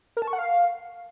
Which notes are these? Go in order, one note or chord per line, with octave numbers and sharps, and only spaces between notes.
A#4
A5
C#6
F#5
F5